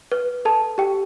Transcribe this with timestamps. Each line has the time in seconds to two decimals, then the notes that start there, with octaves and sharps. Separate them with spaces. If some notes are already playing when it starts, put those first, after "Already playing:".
0.12 B4
0.45 A4 A5
0.78 G4 G5